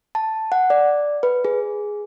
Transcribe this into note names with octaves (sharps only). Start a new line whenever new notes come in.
A5
F#5
D5
B4
G#4